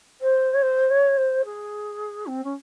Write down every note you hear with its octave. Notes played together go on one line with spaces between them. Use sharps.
C5
C#5
C5
C#5
C5
G#4
C4
C#4